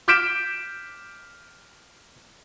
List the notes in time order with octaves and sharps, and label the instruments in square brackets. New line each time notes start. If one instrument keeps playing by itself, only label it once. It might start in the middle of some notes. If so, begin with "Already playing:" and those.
[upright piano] D6 F6 G6 B6 D7 E7